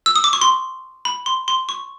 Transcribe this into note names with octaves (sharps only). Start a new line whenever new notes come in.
E6
D#6
D6
C#6
C6
B5
C6
C6
C#6